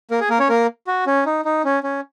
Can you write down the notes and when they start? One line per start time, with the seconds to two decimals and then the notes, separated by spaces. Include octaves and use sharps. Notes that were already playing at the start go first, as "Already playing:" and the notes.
0.11 A#3 A#4
0.20 G#4
0.30 A#3 A#4
0.40 C#4 C#5
0.49 A#3 A#4
0.87 F#4
1.07 C#4
1.26 D#4
1.45 D#4
1.64 C#4
1.83 C#4